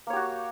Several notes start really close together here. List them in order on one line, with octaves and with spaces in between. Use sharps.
A#3 C#5 G4 F#4